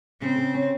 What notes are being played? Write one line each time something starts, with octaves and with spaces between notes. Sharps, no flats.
C#3 C4
C#3
C#4